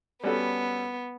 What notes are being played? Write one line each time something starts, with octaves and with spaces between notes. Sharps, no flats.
G3 B3 C#4 F#4 A4